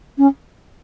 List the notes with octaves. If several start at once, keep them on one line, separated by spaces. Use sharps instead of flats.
C#4